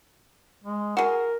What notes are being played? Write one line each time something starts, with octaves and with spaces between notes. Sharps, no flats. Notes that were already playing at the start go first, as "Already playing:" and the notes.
G#3
F#4 G#4 A#4